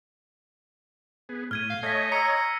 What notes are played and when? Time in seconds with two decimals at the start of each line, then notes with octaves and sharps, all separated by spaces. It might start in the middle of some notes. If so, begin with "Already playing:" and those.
1.29 B3 G#4
1.51 A2 F6 G#6 D#7
1.70 F5
1.83 A3 C#5 D#5 G#5 G#6 A#6 B6
2.12 A#5 E6 C#7